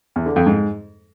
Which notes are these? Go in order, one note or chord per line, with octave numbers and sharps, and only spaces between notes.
E2
D3
F2
G#2